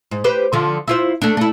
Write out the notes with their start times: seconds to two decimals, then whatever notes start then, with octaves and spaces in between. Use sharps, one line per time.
0.11 G#2
0.24 G4 B4 C5
0.53 D3 F3
0.88 E4 F4 C5
1.22 A3 D4
1.37 A3 E4